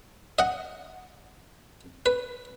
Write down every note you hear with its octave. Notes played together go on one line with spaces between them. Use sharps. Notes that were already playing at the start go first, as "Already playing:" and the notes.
D#5 F#5
B4